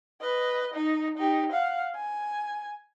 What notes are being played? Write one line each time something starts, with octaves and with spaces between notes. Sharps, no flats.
B4 D#5
D#4
D#4 G4
F5 F#5
G#5